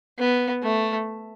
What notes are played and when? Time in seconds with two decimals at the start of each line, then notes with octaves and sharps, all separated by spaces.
0.19 B3
0.63 A3